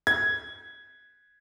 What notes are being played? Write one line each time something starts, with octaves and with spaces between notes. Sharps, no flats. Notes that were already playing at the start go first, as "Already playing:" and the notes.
G#6